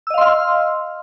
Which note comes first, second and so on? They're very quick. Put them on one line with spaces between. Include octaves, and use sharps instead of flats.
E6 D#5 F5 C6 F6